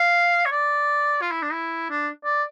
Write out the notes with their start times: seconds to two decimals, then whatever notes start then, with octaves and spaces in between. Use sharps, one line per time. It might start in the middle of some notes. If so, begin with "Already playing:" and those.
Already playing: F5
0.46 C#5
0.52 D5
1.22 F4
1.31 E4
1.42 D4
1.52 E4
1.90 D4
2.25 D5